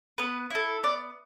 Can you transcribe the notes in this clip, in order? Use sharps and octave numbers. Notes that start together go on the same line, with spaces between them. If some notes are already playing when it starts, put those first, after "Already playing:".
B3 B4
E4 A4
B3 D5